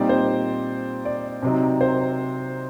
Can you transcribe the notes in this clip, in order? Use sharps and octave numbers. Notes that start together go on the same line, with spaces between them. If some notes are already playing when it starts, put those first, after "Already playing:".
Already playing: A#2 G3 C4 D#4 D5
C5
D5
C3 F#3 C4 D#4
C5